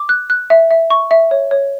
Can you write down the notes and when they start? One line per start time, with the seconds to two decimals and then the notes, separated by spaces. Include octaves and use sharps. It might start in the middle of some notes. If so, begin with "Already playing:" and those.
Already playing: D6
0.09 F#6
0.30 F#6
0.50 E5
0.71 E5
0.90 C#6
1.11 E5
1.31 C#5
1.51 C#5